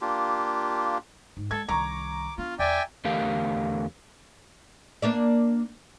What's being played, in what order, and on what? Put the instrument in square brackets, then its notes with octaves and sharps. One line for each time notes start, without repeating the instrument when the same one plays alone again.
[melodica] A#3 D4 F4 G4
[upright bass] G#2
[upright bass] G#3 [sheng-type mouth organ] A4 [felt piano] G#6
[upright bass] C2 D#3 [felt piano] A#5 C#6 [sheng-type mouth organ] D6
[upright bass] B3 D4 [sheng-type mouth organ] F4
[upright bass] E2 [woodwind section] D5 [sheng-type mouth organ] E5 G5 G#5
[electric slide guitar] E2 D3 A3 G4 A#4 F5
[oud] A#3 D4 D5